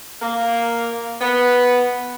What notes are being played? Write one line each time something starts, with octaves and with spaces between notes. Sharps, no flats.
A#3
B3